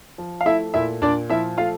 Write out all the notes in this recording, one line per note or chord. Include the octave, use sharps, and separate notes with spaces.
F3
F5
A3 E4 E5
A#2 E4 E5
A#2 D4 D5
F3 E4 E5
A3 F4 F5